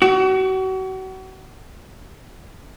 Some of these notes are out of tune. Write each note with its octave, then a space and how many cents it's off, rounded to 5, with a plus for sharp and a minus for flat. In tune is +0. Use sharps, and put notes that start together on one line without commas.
F#4 +35